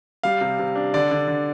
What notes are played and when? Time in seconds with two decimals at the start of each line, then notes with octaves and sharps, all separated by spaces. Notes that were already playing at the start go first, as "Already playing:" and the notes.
0.23 G3 F5
0.41 C3
0.59 C3
0.75 D4
0.94 D3 D5
1.11 D3
1.28 D3